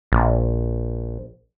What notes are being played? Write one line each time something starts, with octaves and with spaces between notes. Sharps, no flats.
A#1